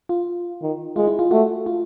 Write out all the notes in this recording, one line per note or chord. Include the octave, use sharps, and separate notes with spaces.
F4
D#3
G#3 F4
E4
F4
A3 F#4
F4